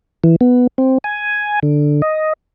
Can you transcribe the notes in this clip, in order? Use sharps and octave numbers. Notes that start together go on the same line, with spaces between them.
E3
B3
C4
G#5
D3
D#5